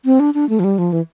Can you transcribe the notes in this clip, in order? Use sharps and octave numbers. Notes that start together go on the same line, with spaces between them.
C4
D4
D4
A3
F3
G3
F3
E3